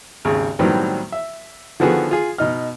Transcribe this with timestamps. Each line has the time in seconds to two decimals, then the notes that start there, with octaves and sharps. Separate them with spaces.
0.25 G#1 D#2 C#3
0.59 A2 D#3 F#3 G3 B3 C4
1.12 E5
1.80 D3 D#3 F3 B3 F#4 G#4
2.11 F4 G#4
2.38 B2 D#4 F6